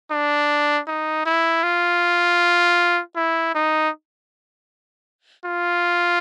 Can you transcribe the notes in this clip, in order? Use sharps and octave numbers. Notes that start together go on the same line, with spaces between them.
D4
D#4
E4
F4
E4
D#4
F4